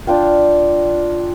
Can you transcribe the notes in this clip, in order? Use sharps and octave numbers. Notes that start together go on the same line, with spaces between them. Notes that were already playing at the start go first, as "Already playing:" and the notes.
D4 F4 F5 G5